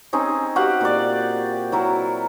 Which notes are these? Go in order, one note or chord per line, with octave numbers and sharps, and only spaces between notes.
C4 C#4 D#4 G#4
F#4 G4 F5 F#5
A#2 D5
F#3 E4 A#4